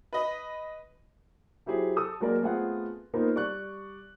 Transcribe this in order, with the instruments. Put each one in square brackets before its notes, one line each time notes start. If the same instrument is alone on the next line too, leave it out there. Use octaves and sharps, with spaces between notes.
[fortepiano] B4 D#5 B5
[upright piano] F#3 E4 G4 G#4 C5
A4 D#6 E6
F#3 G#3 A#3 F#4 A#4 D5
A3 B3 C4 F4 G#4 F#5
A#3 B3 D#4 F4 A#4 C5
G3 D5 C#6 F#6